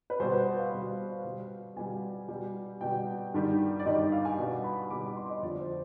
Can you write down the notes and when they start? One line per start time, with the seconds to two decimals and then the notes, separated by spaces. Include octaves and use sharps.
0.10 B4
0.20 B2 G3 C5
0.32 B4
0.59 F5
0.72 B2 G3
1.24 B2 G3
1.76 B2 G3 G#5
2.29 B2 G3
2.81 B2 G3 G5
3.34 G2 D#3 G3
3.79 D5
3.86 G2 D#3 G3 D#5
3.99 D5
4.12 F5
4.25 G#5
4.38 B2 G3
4.64 B5
4.90 B2 G3 D6
5.06 D6
5.17 C6
5.29 D#5
5.43 F2 D3 F3 D5
5.60 C5